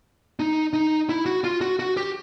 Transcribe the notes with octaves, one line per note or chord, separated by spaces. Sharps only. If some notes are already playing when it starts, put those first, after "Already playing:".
D#4
D#4
E4
F#4
F4
F#4
F#4
G4